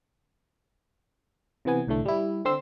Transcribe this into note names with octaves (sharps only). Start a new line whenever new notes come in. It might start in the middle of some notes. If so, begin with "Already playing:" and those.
C3 E3 B3 G#5
C2 A2 D3 A3
G3 E4
D3 C4 C6 E6